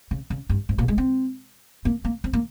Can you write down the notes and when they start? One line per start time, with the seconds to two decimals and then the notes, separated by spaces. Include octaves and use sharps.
0.11 C#3
0.30 C#3
0.49 G2
0.69 G#2
0.78 A#2
0.88 G#3
0.98 C4
1.85 A#3
2.05 A#3
2.24 C4
2.33 A#3